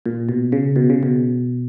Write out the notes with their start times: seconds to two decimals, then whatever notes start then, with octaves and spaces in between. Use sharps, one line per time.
0.06 A#2
0.29 B2
0.52 C#3
0.76 B2
0.90 C#3
1.03 B2